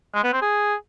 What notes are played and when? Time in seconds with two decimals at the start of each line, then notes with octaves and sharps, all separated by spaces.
0.15 G#3
0.24 B3
0.33 C4
0.42 G#4